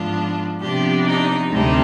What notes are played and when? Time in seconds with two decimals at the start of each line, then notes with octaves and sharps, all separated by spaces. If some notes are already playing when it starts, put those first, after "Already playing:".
Already playing: G#2 F3 B3 D4 F4
0.61 C3 F3 B3 D4 G4
1.07 D#4
1.52 D2 C3 G3 D4 D#4